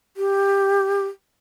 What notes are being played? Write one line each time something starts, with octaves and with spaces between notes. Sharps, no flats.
G4